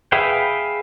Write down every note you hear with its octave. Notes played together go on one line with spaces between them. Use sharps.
G#4 B4 E5 F5 G5